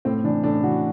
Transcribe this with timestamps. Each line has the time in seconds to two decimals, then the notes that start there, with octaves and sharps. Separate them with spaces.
0.05 A2 C4
0.24 E3 D4
0.44 A2 D4
0.63 E3 F#4